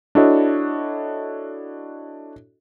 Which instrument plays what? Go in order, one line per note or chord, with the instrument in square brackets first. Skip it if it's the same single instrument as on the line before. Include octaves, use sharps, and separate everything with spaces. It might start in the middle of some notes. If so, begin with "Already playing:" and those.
[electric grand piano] D4 E4 F#4 A4 C#5 D#5